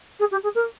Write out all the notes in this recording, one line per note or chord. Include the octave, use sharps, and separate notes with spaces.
G#4
G4
G#4
A#4